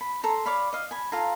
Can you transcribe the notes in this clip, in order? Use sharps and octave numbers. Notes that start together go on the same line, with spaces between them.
B5
A4 A#5 C6
C#5 D5 F5 B5
D#5 F5
G#5 B5
F4 A4 F5 A#5